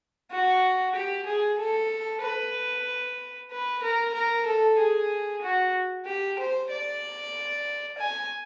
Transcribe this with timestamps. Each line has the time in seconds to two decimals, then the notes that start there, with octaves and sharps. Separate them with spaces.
0.31 F#4
0.95 G4
1.26 G#4
1.58 A4
2.22 B4
3.51 B4
3.83 A#4
4.14 A#4
4.46 A4
4.78 G#4
5.42 F#4
6.06 G4
6.39 C5
6.71 D5
7.98 G#5